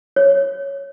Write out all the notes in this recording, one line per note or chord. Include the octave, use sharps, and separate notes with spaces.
C#5